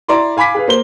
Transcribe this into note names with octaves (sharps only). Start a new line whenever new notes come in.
E4 D5 A#5 C6 D6
F5 G#5 B5 D6 B6
G#4 B4 F5
A#3 C5 G7